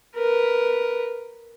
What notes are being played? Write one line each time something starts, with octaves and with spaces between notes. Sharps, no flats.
A#4 B4